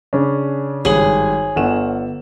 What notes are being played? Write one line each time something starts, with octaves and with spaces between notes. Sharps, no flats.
C#3 C#4 D4
G#1 G2 G#4 C#5 F#7
G1 A4 F#5 E7